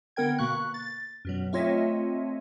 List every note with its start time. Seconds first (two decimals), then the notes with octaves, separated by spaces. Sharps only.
0.16 D3 B3 A#4 G5 G#6
0.38 B2 A#3 C#6 F#6
0.74 A6
1.25 F#2 B2 F#3
1.53 A3 C4 F4 C#5 D#5 E5